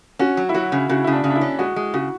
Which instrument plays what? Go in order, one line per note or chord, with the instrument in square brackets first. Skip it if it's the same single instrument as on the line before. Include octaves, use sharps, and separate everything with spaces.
[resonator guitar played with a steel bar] C#4 [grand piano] F#4
[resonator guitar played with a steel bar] F#3
[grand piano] E4
[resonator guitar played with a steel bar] F#3 [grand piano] F#4
[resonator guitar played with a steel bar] C#3
[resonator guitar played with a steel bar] C#3 [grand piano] F#4
[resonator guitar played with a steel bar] C#3 [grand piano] E4
[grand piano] D4
[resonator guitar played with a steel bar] C#3
[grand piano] D4
E4
[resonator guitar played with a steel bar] C#4
[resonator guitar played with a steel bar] G#3 [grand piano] F#4
[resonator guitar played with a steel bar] G#3
[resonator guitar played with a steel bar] C#3 [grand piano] F#4